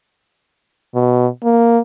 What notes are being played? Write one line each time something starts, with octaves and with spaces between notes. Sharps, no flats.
B2
A#3